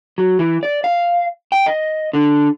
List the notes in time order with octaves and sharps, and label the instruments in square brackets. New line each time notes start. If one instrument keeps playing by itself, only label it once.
[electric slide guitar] F#3
E3
D5
F5
G5
D#5
D3